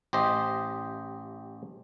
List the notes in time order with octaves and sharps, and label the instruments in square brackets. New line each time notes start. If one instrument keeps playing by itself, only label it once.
[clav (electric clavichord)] A1 G4 C5 D#5